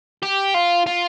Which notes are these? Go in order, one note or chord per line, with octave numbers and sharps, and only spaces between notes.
G4
F4
F4